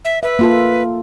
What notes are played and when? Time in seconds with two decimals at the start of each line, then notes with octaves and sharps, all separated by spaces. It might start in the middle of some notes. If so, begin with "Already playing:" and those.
0.05 E5
0.23 B4 E5
0.39 A#3 F4 A4